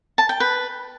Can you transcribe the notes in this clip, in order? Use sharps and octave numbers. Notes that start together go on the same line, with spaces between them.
A5
G5
B4